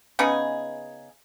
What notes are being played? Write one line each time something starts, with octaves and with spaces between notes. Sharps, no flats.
C#3 B3 D#4 G#4